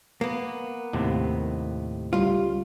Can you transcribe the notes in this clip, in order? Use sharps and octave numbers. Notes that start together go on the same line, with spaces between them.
A#3 B3
D#2 A2 C3
C#2 G3 F4